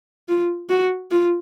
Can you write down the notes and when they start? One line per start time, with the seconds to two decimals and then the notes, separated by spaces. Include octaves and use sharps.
0.29 F4
0.70 F#4
1.11 F4